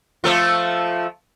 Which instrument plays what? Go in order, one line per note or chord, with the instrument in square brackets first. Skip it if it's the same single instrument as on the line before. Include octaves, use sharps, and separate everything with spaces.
[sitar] F3 A3 F4